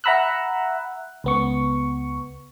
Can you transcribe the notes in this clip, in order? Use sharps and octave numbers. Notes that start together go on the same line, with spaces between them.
E5 F#5 A#5 B5 E6 F#6
C#2 B3 C#6